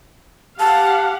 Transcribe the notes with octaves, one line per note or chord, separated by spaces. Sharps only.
G4 F5 F#5 A5